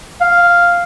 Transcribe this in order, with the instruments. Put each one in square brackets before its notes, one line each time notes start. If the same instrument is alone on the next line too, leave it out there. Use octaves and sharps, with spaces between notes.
[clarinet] F5